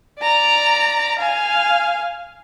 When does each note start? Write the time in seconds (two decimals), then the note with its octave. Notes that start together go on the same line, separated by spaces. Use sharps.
0.20 D5 A#5
1.18 F5 G#5